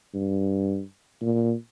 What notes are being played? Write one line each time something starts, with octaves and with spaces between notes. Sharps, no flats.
G2
A#2